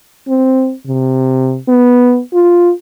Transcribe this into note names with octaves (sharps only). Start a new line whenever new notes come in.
C4
C3
B3
F4